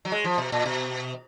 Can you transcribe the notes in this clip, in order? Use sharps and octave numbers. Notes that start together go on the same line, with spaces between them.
F#3
G#3
F3
B2
A#2
B2